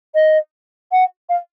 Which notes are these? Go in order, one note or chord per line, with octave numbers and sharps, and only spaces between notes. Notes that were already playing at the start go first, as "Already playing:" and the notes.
D#5
F#5
F5